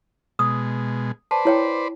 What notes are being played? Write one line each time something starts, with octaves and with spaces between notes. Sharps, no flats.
B2 G#3 D#6
B4 C5 D5 A5
E4 C#5 G5